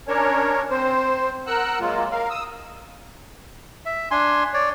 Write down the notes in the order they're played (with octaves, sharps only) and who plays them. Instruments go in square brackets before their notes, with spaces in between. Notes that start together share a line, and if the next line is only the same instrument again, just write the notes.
[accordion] C#4 D4 A#4 C#5
C4 C5
A#4 F#5 E6 F#6
F#3 G#3 A#3 F4
A#4 F5
D#6 E6
[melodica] E5
D4 G#5 C6
C#5 D5